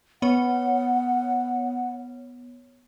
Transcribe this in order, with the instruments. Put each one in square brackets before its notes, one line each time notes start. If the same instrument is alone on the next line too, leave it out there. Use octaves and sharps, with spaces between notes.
[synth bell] B3 C#5 [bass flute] F#5